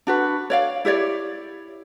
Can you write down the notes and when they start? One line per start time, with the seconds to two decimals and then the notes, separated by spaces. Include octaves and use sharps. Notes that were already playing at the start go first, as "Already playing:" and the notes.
0.07 D4 F#4 B4
0.50 C#5 D5 F5
0.85 E4 G4 C#5 D5